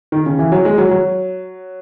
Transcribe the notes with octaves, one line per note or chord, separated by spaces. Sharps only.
D#3
C#3
E3
F#3
G#3
F#3
F#3